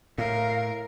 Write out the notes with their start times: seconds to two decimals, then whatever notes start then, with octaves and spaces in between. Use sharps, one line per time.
0.18 A2 A#4 F5